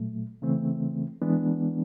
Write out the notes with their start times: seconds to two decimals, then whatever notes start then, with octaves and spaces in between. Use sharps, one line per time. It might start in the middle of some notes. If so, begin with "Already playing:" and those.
Already playing: A#2 F#3 A3
0.42 C#3 E3 A3 C4
1.22 E3 G#3 B3 D4